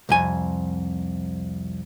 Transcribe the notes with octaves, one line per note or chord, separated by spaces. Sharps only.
C2 F2 G#5